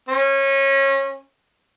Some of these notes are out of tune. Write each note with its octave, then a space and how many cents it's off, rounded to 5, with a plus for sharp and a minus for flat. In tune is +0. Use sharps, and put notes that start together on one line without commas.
C#4 -25